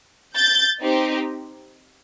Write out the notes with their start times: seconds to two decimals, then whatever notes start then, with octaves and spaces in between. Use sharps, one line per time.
0.36 G6 A6
0.82 C4 D#4 G4